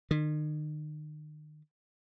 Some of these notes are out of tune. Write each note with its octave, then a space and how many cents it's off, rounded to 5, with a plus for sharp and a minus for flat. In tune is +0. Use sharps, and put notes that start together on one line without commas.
D#3 -40